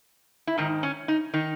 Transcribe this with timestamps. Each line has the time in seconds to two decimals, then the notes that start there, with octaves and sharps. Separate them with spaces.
0.47 E4
0.58 G#2 D#3 D#4
0.83 C#4
1.08 D#4
1.33 D#3 D#4